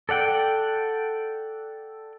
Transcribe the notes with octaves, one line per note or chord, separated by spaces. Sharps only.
A4 D5 F#5 G5